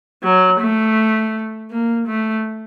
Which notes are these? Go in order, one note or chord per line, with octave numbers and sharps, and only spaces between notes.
F#3
A3
A#3
A3